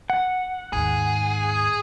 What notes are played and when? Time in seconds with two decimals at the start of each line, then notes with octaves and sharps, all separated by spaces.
0.10 F#5
0.73 D#2 G#2 G#4